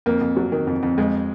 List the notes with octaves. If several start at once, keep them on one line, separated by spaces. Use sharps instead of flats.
F2 A#3
F2
F#3
D#3
F2
F2
F2 G#3